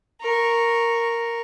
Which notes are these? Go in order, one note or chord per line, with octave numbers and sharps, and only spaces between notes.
A#4 C#6